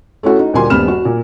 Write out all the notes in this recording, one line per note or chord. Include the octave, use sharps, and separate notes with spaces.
A3 C#4 E4 F#4 A4
D#4
D2 A#2 G3 A#3 G#5 C6
D#1 G2 B3 B5 F6 E7
F#4
A#2